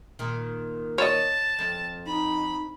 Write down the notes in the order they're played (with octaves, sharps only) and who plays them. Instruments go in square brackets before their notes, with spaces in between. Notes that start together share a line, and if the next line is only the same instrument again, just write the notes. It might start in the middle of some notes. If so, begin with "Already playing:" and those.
[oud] A#2 D#3
[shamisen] C#5 D#5 [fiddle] A5
[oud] F2
[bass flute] D#4 [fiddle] B5